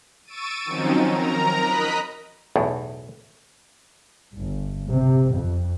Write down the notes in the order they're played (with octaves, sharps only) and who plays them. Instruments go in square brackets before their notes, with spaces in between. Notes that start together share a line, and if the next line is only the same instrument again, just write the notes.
[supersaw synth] C#6 E6 A6 D7 D#7
D#3 F3 F#3 C4 C#4 D#4
A#4 A#5
D#5 B5 D#6 F#6 B6
[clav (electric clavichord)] B1 E2 A2
[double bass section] G1
C3
F2